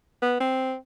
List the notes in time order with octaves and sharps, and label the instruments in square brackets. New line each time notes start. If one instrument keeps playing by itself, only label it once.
[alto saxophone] B3
C4